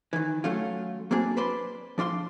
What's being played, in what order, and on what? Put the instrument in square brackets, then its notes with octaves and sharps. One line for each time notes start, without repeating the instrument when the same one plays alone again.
[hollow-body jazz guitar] D#3 E3
F#3 A3 C#4 F4
F#3 A#3 C4 D4 G#4
B4 C5 D5 B5 C6
F3 D4 F4 C6